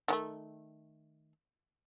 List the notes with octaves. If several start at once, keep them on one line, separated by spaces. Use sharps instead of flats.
D#3 F#3 A3